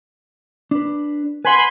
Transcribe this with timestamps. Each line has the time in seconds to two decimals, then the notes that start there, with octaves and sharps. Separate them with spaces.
0.71 D4 B4
1.45 B4 F#5 G#5 B5 C6